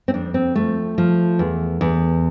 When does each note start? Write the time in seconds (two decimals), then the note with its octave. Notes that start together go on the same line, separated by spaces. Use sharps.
0.08 C4
0.14 F2 D4
0.34 C4
0.55 F3 A3
0.98 F3
1.39 E2
1.81 E2